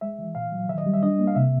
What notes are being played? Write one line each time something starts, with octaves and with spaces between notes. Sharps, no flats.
G#3 E5
E3
A#2 F5
F#3
D#3 E5
D#5
G3
E5
D4 D#5
A#3
F5
C3 E5